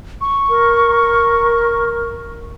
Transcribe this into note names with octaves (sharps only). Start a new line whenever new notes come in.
C#6
A#4